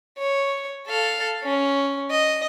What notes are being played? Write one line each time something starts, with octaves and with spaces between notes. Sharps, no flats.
C#5
A4 F5
C#4
D#5